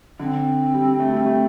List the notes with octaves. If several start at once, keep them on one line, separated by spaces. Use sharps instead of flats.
D3 C4
G3
A3
G3
A3